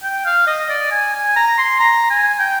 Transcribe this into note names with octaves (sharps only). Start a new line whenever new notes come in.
G5
F5
D#5
D5
G#5
G#5
A#5
C6
A#5
G#5
G5